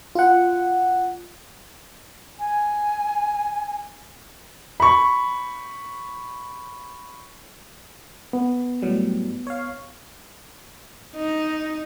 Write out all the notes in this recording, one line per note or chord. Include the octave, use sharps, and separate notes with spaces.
F4 F#5
G#5
B5 C#6
B3
A2 F#3 G3
C#5 F5
D#4